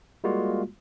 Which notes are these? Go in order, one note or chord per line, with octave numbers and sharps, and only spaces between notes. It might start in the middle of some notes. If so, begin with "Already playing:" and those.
G3 G#3 A#3 F4 F#4